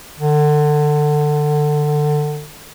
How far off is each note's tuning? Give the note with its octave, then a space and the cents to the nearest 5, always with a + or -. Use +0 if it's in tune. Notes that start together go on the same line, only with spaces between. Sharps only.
D3 +25